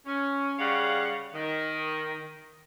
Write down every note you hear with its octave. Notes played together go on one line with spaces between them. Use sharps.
C#4
C#3 G3 C#5 F5 F#5
D#3